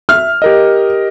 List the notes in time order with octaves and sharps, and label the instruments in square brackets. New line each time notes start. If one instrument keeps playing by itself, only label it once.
[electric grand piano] E5 [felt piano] F6
[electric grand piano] G4 A#4 D#5